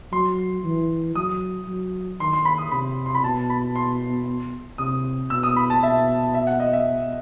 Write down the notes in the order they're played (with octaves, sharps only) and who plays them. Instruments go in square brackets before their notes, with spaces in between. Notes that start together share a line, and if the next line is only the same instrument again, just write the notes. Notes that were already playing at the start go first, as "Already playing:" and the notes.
[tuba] F#3 [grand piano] C6
[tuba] E3
[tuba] F#3 [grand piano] D#6
[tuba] F#3
[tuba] D#3 [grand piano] C6
[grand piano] C6
B5
D#6
[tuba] C3 [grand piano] B5
[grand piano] C6
B5
[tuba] B2 [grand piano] A5
[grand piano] B5
C6
[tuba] C3 [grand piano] D#6
[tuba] B2 [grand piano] E6
[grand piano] D#6
B5
A5
[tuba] B2 [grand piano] E5
[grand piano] E5
F#5
D#5
E5